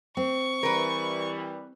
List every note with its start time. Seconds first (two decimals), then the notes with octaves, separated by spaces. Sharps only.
0.17 C4 C#6
0.63 E3 G3 A#4 B4